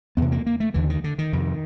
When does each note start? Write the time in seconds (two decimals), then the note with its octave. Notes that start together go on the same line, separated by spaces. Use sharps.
0.17 E2 C3 B3
0.32 A#3
0.46 A#3
0.60 A3
0.74 D#2 D3 E3
0.90 D#3
1.04 D3
1.18 D#3
1.33 F2 C3